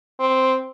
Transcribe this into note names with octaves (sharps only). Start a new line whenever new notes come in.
C4